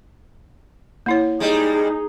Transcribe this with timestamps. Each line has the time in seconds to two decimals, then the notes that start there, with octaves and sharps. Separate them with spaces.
1.06 A#3 E4 C#5
1.40 G3 G#3 D#4 G#4